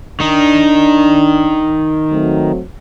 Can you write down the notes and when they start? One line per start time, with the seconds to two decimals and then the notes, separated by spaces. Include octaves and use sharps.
0.20 D#3 D4 D#4
2.12 F#3 A3 C4